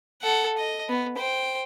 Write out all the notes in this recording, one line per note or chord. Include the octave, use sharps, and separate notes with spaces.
A4 F#5
D#5
B3
C5 G5